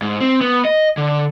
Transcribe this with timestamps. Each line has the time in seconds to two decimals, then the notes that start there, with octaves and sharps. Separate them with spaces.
0.02 G#2
0.20 C4
0.41 B3
0.65 D#5
0.97 D3